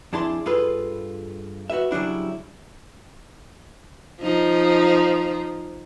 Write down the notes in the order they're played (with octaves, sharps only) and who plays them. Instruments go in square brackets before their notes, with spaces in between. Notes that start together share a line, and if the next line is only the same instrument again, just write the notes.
[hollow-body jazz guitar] F2 D4 E4 G#4 A5 C6
G2 F4 G#4 A4 B4
F#4 G#4 B4 E5
C#3 F#3 G3 D4 E4
[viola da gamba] F3 D#4